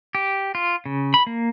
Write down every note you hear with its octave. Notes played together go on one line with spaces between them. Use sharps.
G4
F4
C#3
B5
A#3